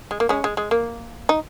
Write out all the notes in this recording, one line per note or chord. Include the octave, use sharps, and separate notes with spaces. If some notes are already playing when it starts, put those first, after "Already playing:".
G#3
A#3
G#3 C#4
G#3
G#3
A#3
D#4